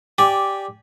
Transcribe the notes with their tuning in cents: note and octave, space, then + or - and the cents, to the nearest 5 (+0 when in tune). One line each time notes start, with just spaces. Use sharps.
G4 +0 D5 -5 G#5 +0